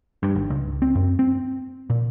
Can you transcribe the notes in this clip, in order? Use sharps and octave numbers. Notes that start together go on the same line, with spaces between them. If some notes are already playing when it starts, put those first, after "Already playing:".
G2
G#1
C#2
C4
F#2
C4
A#2